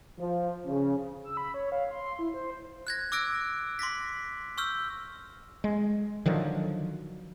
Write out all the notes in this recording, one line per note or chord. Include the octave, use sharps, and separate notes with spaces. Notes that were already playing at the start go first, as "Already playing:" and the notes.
F3
C#3
E6
B5
C#5
F5
C6
E4
C5
F#6 G#6 A#6
D6 E6 F#6 A#6 D7
C6 D6 A#6 B6
C#6 E6 F6 G6
G#3
D3 D#3 F3 F#3